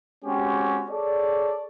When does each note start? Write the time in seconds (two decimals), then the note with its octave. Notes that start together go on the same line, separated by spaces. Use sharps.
0.25 G#3 C4 C#4 F#4 G4
0.89 G#4 A4 C#5 D5